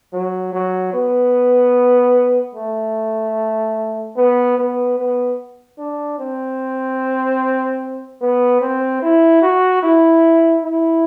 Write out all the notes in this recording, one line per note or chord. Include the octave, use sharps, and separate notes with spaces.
F#3
F#3
B3
A3
B3
B3
B3
D4
C4
B3
C4
E4
F#4
E4
E4